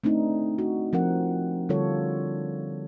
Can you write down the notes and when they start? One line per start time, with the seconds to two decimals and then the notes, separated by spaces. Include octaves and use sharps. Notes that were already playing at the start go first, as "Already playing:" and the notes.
0.04 A3 C4 D4 D#4
0.58 F#4
0.93 F3 C4 A#4 F#5
1.69 D3 G3 F4 A4 C#5